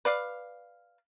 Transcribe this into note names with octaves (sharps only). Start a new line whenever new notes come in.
B4 D5 F5